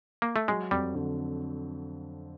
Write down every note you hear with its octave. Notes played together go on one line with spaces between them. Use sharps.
A#3
A3
F#3 G#3
F2 G3
D3